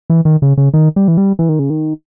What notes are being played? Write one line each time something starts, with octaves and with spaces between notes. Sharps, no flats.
E3
D#3
C#3
C#3
D#3
G3
E3
G3
E3
D#3
C#3
D#3